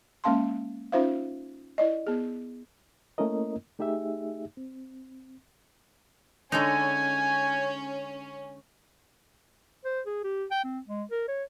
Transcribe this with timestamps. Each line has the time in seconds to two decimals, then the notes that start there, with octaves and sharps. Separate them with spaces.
0.24 G#3 A#3 C#4 F5 A5 C6
0.92 C#4 D#4 F4 C5 E5 F5
1.78 E4 D5 D#5
2.07 B3 G#4
3.18 A3 A#3 C#4 E4 A#4 D#5
3.79 A3 D#4 G4 G#4 E5
4.57 C4
6.52 D3 G#3 C#4 D#4 G#5
9.85 C5
10.06 G#4
10.24 G4
10.51 G5
10.64 C4
10.88 G#3
11.11 A#4
11.28 C#5